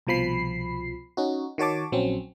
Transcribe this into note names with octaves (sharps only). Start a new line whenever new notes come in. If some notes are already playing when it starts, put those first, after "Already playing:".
C2 B2 F3 B5 C7
C#4 D#4 F#4
D#3 F#4 C#5 A5 D6
A#1 F#3 C4 C#4